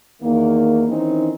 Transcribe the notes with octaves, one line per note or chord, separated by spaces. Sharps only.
E2 D#3 A#3
D#3 E3 C4 C#4 D#4